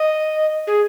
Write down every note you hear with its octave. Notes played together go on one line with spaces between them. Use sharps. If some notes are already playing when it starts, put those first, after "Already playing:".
Already playing: D#5
G#4